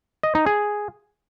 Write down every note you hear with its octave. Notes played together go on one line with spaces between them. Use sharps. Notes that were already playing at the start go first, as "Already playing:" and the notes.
D#5
D#4
G#4